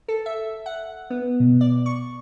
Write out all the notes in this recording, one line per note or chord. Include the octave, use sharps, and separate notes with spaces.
A4
E5
F#5
B3
B2
D5
C#6